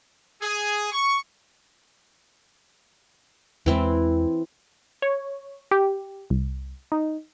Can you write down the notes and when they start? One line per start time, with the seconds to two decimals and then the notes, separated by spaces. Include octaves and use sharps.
0.42 G#4
0.92 C#6
3.66 E2 E3 G#3 C4 E4
5.02 C#5
5.71 G4
6.30 C2
6.92 D#4